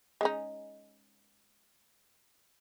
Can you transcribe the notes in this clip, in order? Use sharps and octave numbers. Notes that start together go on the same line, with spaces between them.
G#3 C#4 D#4